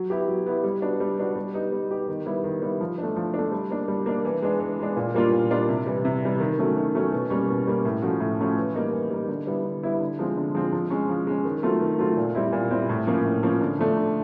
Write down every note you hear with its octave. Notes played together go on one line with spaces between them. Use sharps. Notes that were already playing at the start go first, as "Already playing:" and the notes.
Already playing: F#3
B3 E4 G4
F#3
B3 E4 G4
G3
B3 D4 F#4
G3
B3 D4 F#4
G3
B3 D#4 G4
G3
B3 D#4 G4
D#3
G3 B3 E4
D#3
G3 B3 E4
F3
A3 D4
F3
A3 D4
G3
A#3 D4
G3
A#3 D4
E3
G#3 B3 D4
E3
G#3 B3 D4
A#2
G3 A#3 D4 F4
A#2
G3 A#3 D4 F4
C3
E3 G3
C3
E3 G3
D#3
F#3 A3 C#4
D#3
F#3 A3 C#4
B2
G3 A#3 C#4
B2
G3 A#3 C#4
A2
F3 A3 C#4 F#4
A2
F3 A3 C#4 F#4
E3
G3 A#3 D#4
E3
G3 A#3 D#4
D3
G3 B3 E4
D3
G3 B3 E4
D3
F3 G#3 C4
D3
F3 G#3 C4
F3
G#3 C#4
F3
G#3 C#4
D#3
F#3 A3 C4 F4
D#3
F#3 A3 C4 F4
A#2
G3 C4 E4
A#2
G3 C4 E4
A2
F3 A#3 C#4
A2
F3 A#3 C#4
D3
F3 A3 D4
D3